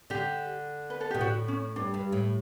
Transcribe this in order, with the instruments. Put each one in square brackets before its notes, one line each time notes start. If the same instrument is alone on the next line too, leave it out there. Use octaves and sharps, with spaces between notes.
[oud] D3 [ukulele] G4
[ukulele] B4
A4
[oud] B2 [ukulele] G4
[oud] A2 [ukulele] F#4
[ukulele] C#4
[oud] G2 [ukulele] D4
[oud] G2
A2